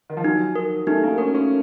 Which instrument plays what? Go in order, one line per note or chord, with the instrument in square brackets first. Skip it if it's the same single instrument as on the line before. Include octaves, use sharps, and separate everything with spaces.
[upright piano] D#3
F3
[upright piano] F#3 [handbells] D#4
[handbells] A#4
[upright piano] A3 [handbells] D#4
[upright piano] A#3
[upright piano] C#4 [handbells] A#4
[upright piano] C#4